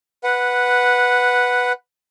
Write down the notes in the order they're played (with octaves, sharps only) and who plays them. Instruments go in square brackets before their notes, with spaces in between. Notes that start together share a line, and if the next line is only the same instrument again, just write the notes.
[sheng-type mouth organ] B4 F#5